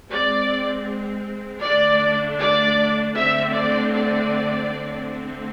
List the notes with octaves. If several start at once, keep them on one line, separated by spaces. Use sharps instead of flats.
G#3 C4 D5
D3 A3 D4 D5
D5
D3 A3 C4 E5
D5
D5
D3 A3 C4